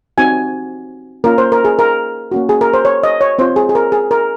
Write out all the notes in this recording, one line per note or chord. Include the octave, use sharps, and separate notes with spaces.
C4 D#4 F#4 G#5
A#3 C#4 F4 A#4
C5
A#4
G#4
A#4
A#3 C#4 F#4
G#4
A#4
C5
C#5
D#5
C#5
C4 F4 C5
G#4
G#4
A#4
G#4
A#4